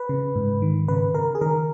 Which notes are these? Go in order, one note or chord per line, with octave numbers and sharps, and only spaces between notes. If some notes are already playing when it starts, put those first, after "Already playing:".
Already playing: B4
C#3
G#2
D#3
C#3 B4
C#3 A#4
G#4
D#3 A#4